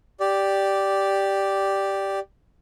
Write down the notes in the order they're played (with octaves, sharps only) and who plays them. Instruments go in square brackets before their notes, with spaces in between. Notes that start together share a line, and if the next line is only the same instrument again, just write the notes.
[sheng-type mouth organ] G4 D5